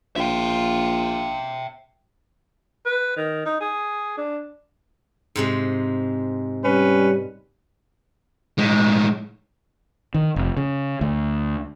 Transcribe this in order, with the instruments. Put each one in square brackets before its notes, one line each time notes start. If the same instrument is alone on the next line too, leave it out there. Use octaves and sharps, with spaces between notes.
[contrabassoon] A#1 [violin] F4 [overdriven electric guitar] E5 G5
[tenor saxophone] B4
D#3
D#4
G#4
D4
[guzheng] G#2 C3 G#3
[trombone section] G3 [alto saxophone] C#4 [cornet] B4
[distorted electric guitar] A2 G#3
[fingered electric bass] D#3
F1
C#3
D2